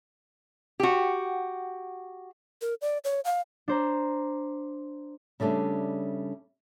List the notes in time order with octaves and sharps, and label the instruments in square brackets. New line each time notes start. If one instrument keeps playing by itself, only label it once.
[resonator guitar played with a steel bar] F#4 G4
[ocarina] A#4
D5
C#5
F5
[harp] D4 C5 A#5
[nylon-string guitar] C#3 G3 A3 D4